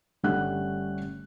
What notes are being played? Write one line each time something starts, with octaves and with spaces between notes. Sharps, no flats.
G1 G3 A3 C#4 F#5 F#6